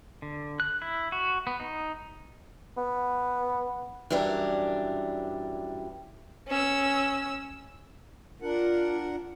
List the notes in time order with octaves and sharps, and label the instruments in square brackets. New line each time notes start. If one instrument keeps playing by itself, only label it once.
[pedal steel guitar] D3
F#6
E4
F#4
B3
D#4
[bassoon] B3
[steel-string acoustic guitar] F#2 E3 G3 D4 A#4
[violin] C#4 E6
[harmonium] D4 A#4 F#5 [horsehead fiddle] F4